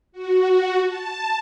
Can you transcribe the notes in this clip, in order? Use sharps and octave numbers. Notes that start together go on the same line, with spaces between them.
F#4
A5